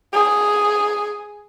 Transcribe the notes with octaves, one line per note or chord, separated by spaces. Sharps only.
G#4